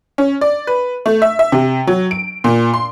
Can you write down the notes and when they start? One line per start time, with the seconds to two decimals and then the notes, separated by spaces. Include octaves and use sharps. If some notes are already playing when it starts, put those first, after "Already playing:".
0.18 C#4
0.41 D5
0.67 B4
1.06 A3
1.22 E5
1.39 E5
1.52 C3
1.87 F#3
2.11 D7
2.44 A#2
2.74 C6